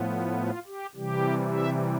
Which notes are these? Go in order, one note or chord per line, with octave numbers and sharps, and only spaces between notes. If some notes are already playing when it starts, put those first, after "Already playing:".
Already playing: A2 F3 B3
F4
G4
C3 E3 G3 G4
E5